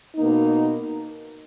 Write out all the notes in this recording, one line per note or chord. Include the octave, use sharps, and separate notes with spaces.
B2 A#3 D#4